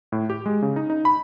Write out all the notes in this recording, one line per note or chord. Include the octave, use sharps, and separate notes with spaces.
A2
G4
G#3
C#3
D#4
D#4
B5